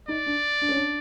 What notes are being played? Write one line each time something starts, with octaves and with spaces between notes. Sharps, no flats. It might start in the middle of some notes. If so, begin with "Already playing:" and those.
D#4 D5
D4
D4
C#4
D4